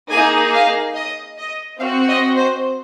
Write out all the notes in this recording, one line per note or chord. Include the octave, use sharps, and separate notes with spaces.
A#3 D#4 G#4 G#5
F5
D#5
D#5
C4 F#4 F5
D#5
C5